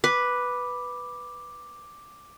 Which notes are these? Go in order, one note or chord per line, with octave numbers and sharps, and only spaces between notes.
B4 D6